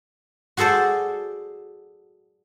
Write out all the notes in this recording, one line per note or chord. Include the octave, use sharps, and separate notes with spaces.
F#4 G#4 A4 C5 D5